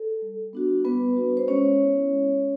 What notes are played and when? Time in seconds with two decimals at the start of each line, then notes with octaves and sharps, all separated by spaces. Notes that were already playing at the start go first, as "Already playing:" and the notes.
Already playing: A4
0.22 G3
0.53 B3 D4 F#4
0.85 G3 B3 B4
1.17 B3 D4 F#4
1.37 C5
1.47 G#3 C#4 C#5
1.80 B3 E4
2.11 G#3